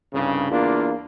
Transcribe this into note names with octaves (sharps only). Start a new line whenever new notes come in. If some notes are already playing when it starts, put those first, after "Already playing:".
C2 G2 C#3
E2 A#3 D4 F4